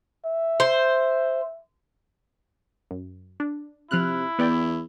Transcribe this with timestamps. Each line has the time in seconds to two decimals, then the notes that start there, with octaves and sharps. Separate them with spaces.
0.25 E5
0.60 C5
2.91 F#2
3.40 D4
3.91 C3 F3 E4 F6 F#6
4.39 E2 B3 D5 G5